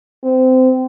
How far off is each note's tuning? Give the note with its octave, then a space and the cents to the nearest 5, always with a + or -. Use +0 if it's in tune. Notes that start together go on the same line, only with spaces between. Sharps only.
C4 -25